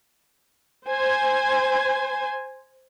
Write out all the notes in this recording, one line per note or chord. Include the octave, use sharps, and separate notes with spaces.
C5 G#5